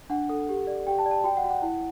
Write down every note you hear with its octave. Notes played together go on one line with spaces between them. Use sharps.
D4 F#5
A4
G4
D5
G4 G5
A5
D5
A5
F#4 G5
F#5
F#4
F#5
E4 F#5